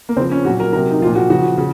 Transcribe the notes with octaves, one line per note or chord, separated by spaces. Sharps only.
A#3
C#3 F3 C4
C#4
A#2 F#3 F#4
A#4
C3 F#3 A#4
D#4
A#2 F3 F4
F#4
C#3 F3 F#4
C#3